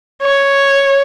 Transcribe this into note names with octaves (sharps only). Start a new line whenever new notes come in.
C#5